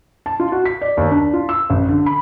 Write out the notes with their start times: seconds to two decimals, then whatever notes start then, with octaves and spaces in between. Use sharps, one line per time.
0.26 A5
0.40 F4
0.52 F#4
0.65 B6
0.81 D5
0.97 D#2
1.11 D4
1.33 F4
1.49 E6
1.70 A1
1.89 D3
2.06 B5